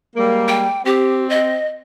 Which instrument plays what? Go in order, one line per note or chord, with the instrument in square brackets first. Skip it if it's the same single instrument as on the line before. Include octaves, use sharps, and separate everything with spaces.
[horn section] G3 G#3 A#3
[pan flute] G5
[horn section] C4 [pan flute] G4
[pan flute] D#5